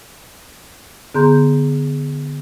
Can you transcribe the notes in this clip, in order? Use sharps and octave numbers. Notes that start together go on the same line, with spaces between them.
D3 B3 G#4 A#5 C6 G6